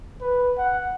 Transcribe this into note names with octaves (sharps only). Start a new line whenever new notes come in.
B4
F#5